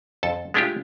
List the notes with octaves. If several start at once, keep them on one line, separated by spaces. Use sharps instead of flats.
F2 A4 A5
G#3 A3 D4 E4 F4 G4